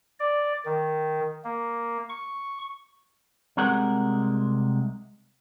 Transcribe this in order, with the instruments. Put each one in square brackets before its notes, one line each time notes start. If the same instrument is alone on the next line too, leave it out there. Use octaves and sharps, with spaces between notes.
[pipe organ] D5
D#3
A#3
C#6
[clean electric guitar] C2 C3 G#3 A#4 F#5